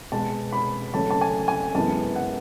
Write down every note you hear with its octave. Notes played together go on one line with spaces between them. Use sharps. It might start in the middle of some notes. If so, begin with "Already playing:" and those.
B2 G#3 B3 A5
B5
C#3 F#3 A3 A5
A5
G#5
G#5
F#2 E3 G#3 B3 A5
F#5